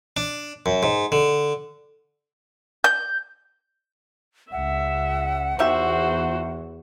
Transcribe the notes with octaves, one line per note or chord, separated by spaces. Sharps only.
D4
F#2
G#2
D3
G6
C#2 E5 F#5
E2 D#3 F#4 G4 C5 E5